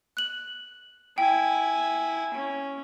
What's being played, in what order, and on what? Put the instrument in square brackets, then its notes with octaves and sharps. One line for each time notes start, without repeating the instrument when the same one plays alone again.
[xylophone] F#6 F#7
[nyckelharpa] E4 G#5 [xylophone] G5
[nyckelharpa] C#4